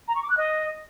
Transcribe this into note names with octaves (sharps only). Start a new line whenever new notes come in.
A#5
C#6
D6
F#6
D#5